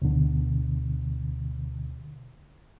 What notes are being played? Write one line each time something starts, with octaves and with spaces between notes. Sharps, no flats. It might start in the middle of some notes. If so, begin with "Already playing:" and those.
D2 B2 D3